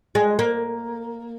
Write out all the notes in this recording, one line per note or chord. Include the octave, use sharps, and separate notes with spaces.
G#3
A#3